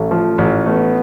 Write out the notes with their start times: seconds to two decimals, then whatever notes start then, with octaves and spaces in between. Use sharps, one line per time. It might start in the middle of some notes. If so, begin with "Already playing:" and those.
Already playing: A1 A3
0.11 F3
0.38 A1
0.66 A3 B3